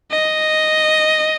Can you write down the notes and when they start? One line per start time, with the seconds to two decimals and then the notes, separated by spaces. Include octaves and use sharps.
0.11 D#5